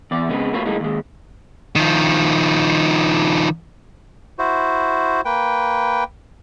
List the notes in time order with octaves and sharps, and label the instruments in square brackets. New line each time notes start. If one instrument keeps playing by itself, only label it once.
[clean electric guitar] E2 D5
C#3 G#3 B3 C4
A3 A#3 F4 F#4 B4 C#5
F#2 A2 G#3 A#3 D#4
D#2 G#3
[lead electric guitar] D#3 F3
[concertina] E4 F#4 C5
A#3 B4 G5